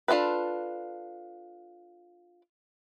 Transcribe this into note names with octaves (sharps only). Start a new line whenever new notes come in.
D4 F4 G#4 A4 B4